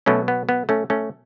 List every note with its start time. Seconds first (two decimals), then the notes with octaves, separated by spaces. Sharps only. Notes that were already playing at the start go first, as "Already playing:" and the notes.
0.06 B2 F#3 A3 C#4
0.28 B3
0.49 B3
0.69 A3 C#4
0.90 A3 C#4